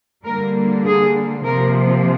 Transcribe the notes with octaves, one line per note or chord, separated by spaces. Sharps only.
D3 G3 A#3 A#4
G#4
C3 F3 A#3 A#4